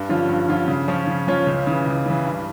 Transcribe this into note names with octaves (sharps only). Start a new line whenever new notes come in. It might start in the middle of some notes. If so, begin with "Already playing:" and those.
Already playing: G2
D3 F3 C#4 F4
G2
D3 F3 C#4 F4
C#3
F3 C#4 F4 C#5
C#3
F3 C#4 F4 C#5
C#2
C#3 E3
C#2
C#3 E3
G2